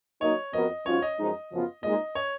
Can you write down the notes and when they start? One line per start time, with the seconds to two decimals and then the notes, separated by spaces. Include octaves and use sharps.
0.21 F#3 A#3 D#4 A#4 C#5 D#5
0.53 F2 F3 B3 F#4 A#4 D#5
0.85 G#2 F#3 C#4 F4 C#5
1.02 D#5
1.18 F#2 F3 G#3 D#4
1.51 F#2 C#3 F3 B3 F4
1.83 A#2 G#3 D#4 D#5
2.15 C#5